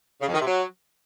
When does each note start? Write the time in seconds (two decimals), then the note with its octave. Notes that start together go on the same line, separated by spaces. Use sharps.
0.21 C#3
0.27 F2
0.34 D#3
0.40 C3
0.47 F#3